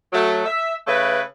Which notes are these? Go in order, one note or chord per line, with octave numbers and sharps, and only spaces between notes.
F#3 A3
E5
C#3 A3 B4